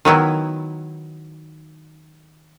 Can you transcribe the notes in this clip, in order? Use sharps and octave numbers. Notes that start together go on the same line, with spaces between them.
D#3 F#3 B3 E4